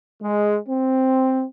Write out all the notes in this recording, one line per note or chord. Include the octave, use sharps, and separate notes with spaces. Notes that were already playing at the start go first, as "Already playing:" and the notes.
G#3
C4